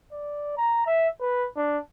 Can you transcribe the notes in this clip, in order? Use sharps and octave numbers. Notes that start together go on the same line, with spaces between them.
D5
A#5
E5
B4
D4